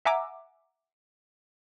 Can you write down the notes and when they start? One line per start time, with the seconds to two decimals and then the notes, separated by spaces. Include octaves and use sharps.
0.05 E5 F#5 G#5 A#5 D6 E6